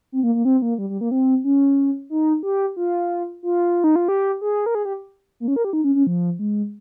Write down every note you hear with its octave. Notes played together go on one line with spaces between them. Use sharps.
C4
A#3
A#3
C4
A#3
G3
G3
A#3
C4
C#4
D#4
G4
F4
F4
D#4
F4
G4
G#4
A#4
G#4
G4
A#3
C#4
A#4
G4
D#4
C#4
C#4
F3
G#3